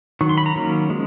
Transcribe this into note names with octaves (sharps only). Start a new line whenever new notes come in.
D#3 F#3 C#6
C6
B5
A#5
D#3 F#3 A#3 C#4
F3 G#3